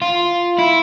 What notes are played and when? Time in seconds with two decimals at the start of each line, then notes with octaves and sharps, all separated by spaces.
0.02 F4
0.59 E4